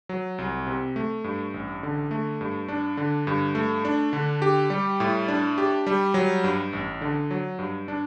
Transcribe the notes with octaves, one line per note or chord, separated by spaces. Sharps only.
F#3
C2
C3
A3
G2
A1
D3
A3
G2
D4
D3
G2
A3
D4
D3
G4
G3
A2
D4
G4
G3
F#3
G2
A1
D3
F#3
G2
D4